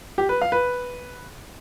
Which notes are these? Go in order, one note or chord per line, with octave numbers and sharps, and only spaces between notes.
G4
B4
F5
B4